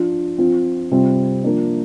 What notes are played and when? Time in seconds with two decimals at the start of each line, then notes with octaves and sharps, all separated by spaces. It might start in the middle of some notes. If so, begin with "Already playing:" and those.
Already playing: F3 D4 F4
0.38 F3 C4 F4
0.91 C3 G3 C4 F4
1.44 F3 A#3 D4